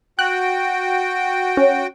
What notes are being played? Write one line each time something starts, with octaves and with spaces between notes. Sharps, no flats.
F#4 G5 F#6
C#4